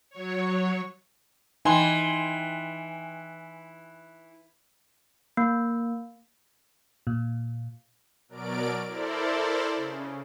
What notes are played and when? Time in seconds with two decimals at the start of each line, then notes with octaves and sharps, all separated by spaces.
0.10 F#3 C#5
1.65 E3 D#4 G5 G#5 C6
5.37 A#3
7.07 A#2
8.29 B2 F#3 A#4 D5 D7
8.88 E4 A4 A#4 C5 D5
9.76 C#3